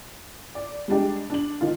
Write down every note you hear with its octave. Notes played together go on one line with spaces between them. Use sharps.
D5
G3 G#3 D4 G4
D4 F#7
D#3 F4